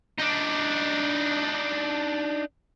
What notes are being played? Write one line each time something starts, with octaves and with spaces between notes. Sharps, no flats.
D4 D#4